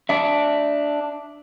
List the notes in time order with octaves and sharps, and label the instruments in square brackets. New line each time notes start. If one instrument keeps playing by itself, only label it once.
[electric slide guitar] D4 E5